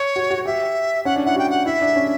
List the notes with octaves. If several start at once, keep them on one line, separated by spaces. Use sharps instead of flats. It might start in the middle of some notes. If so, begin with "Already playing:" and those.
Already playing: C#5
F#4
F#4
G4 E5
C#4 F#5
D4
E4 F#5
F#4 G5
F#5
E4 E5
D4
C#4